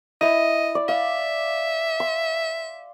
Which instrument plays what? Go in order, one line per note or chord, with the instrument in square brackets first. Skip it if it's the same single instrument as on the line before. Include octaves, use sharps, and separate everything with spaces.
[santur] E4 E5 [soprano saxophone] D#5
[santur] D5
[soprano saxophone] E5 [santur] F5
[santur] C6